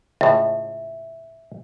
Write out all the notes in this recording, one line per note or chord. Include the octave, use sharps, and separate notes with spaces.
C#2 A2 E5